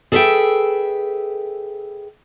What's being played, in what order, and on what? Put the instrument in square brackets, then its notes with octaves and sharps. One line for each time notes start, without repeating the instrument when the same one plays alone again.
[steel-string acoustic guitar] G#4 A4 B4 C5 E5 G5